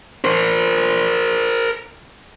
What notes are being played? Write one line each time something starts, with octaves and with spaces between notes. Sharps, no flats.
A#4 C5